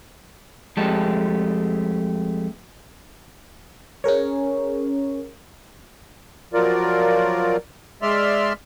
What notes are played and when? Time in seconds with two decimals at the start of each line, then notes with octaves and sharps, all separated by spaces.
0.77 F2 G#3 A3 G4 A5
4.04 C#4 G#4 A#4 C#5
6.54 F3 F#3 F4 A#4 D5
8.02 G#3 D5 E5 C6 F6